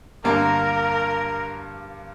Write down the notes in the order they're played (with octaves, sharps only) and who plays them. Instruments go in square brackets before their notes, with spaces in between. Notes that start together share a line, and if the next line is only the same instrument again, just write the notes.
[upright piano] G2 D3 A#3 [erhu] A#4